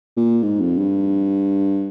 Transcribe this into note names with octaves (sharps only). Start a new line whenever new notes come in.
A#2
G#2
F2
G2